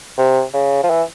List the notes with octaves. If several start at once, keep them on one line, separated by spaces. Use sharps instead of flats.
C3
C#3
F3
E3